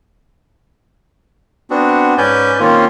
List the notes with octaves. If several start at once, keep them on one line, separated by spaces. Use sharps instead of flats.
B3 C4 D4 F#4
G#2 C#4 B4 D5 G#5 G6
D#3 A#3 C4 C#4 F4